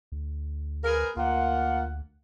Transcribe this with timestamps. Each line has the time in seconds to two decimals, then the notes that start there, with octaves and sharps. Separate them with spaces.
0.12 D2
0.84 G#4 A#4 B4
1.16 D2 A#3 F4 F#5